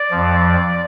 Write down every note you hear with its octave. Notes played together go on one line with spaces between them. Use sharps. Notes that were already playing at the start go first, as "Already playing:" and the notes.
Already playing: D5
F2 F3